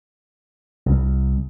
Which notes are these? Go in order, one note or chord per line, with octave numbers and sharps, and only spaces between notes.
C2